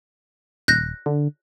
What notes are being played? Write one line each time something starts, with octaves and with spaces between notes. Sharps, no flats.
D#1 F#6 G6 A#6
D3